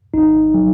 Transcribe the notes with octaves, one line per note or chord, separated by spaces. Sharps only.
G#1 D#4
F#3